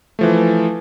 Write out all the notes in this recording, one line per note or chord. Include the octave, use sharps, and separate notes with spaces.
E3 F3 A3